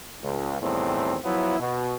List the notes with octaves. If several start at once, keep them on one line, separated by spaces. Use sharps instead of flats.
C#2
E2 A2 D#3 G3 C4
F3 F#3 B3 E4
B2